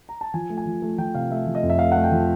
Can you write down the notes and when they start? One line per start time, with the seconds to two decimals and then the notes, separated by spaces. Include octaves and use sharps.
0.09 A#5
0.21 A5
0.34 F3 G#5
0.50 A3
0.57 G#5
0.66 F3
0.82 A3
0.98 F3 G5
1.15 C3 F5
1.31 A3 E5
1.46 F3
1.55 D#5
1.63 F2
1.69 E5
1.79 A3 F5
1.92 A3 F#5
2.04 G5
2.12 F3